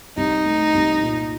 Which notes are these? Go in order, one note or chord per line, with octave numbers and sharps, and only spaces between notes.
C2 D#4
A3
C2
A#2